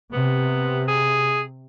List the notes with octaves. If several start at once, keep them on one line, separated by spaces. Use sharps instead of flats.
C3 B3
G#4